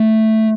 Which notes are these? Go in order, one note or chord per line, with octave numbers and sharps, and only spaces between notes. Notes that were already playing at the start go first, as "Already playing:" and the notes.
Already playing: A3